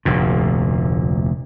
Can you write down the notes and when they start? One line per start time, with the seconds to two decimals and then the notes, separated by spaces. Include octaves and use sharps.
0.05 F1 D2 A#2